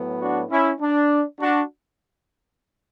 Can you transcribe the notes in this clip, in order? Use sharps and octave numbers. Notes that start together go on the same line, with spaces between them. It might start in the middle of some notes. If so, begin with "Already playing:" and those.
Already playing: A2 F#3 B3
D4 F#4
C#4 E4
D4
D4 F#4